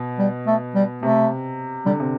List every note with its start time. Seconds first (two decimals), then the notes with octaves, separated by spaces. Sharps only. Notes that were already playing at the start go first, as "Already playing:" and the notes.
Already playing: B2
0.19 G3
0.47 A3
0.75 G3
1.03 C3 A3
1.86 D3 G3
2.00 C3